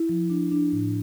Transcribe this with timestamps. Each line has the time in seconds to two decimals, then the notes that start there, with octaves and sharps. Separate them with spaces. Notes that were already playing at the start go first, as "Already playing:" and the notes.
Already playing: E4
0.09 F3
0.30 D4
0.51 D4
0.72 A2